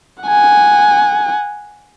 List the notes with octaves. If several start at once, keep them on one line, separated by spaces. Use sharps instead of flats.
F#5 G#5